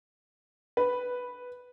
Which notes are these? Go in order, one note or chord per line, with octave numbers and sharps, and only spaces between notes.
B4